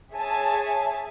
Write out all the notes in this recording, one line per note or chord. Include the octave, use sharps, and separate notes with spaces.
G#4 C#5 E5 G#5 A5